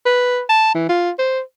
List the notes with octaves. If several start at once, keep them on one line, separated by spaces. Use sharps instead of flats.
B4
A5
E3
F4
C5